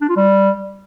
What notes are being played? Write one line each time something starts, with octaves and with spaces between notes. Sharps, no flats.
D4
F4
G3